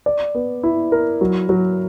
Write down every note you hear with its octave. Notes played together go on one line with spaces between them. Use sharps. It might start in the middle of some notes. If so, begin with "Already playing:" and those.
D5
B3
E4
A#4
F#3
F#3